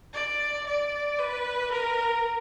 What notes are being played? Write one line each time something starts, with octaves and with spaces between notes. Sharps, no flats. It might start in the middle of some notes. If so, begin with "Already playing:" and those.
D5
D5
B4
A#4